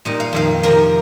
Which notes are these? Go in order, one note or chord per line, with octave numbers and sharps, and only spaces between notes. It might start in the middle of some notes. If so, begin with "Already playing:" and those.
A#2 G3 D#4 D#5
F5
F2 D#3 A#3 F5
C3 F3 A#3 F4 A#4